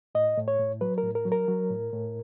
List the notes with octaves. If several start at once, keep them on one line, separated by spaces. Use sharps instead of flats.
A2 D#5
A2
C#5
A2
F#3 B4
A#4
A2
A#4
F#3
A#4
F#3
A2
A2